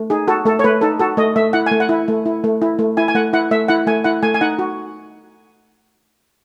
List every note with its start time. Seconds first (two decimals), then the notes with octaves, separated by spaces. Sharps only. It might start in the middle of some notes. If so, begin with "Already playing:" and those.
Already playing: A3
0.10 D#4 G#4
0.28 F#4 A4
0.45 A3 A4
0.59 C#5
0.64 A3 B4
0.81 D#4 A4
1.00 F#4 A4
1.17 A3 D#5
1.36 A3 E5
1.53 E4 F#5
1.66 A3 G#5
1.80 F#5
1.89 E4
2.08 A3
2.26 E4
2.44 A3
2.62 E4
2.79 A3
2.97 E4 G#5
3.08 G#5
3.15 A3 F#5
3.33 E4 F#5
3.51 A3 E5
3.68 E4 F#5
3.87 A3 G#5
4.04 E4 F#5
4.23 A3 G#5
4.34 G#5
4.41 D#4 F#5
4.59 F#4